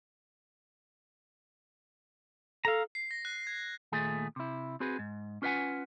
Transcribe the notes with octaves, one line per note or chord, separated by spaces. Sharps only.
A4 F5 A#5
C7
A#6
F#6
G#6
D#2 A#2 A3 G#4
C3 E4
C4 F#4 G#4 B4
G#2
C#4 F4 B4 C#5 F#5 G#5